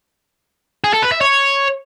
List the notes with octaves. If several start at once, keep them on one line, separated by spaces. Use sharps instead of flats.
G#4
A4
B4
E5
C#5